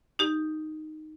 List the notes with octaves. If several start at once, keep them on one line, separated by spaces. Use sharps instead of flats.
D#4 G4